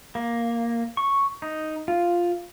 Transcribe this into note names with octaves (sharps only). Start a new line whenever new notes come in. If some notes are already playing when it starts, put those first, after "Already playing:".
A#3
C#6
D#4
F4